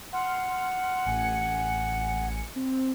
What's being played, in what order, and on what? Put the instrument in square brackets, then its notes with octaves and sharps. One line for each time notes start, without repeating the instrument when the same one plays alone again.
[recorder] F#5 [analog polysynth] C6 F6
[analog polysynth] A1 G#5 C#7
C4